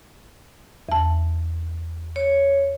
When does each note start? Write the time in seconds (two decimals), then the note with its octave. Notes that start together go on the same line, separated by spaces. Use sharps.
0.89 E2 A5
2.16 C#5